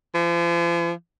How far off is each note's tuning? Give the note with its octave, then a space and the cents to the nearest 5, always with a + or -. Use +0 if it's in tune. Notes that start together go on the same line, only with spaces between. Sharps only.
F3 -40